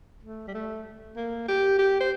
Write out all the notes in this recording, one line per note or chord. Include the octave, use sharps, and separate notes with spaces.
A3
G3
A3
A#3
G4
G4
C5